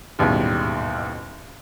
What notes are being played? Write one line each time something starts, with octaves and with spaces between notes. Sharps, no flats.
A1 D#2 G#2 B2 G3